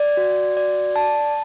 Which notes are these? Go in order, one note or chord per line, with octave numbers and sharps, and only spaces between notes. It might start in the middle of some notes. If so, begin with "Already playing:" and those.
Already playing: D5
F#4
D5
A5